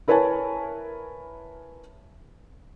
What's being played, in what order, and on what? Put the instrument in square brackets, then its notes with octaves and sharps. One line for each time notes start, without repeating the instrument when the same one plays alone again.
[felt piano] E4 A#4 B4 C#5 G#5 A5